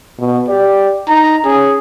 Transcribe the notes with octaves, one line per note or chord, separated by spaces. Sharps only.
B2
G4 D5
D#4 A#5
C#4 G#4